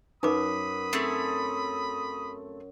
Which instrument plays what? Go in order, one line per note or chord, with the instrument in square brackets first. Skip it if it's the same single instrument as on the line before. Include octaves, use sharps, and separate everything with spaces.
[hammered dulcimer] F#2 [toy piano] D#4 B4 D6 [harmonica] B5 D#6
[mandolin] A3 C4 G#4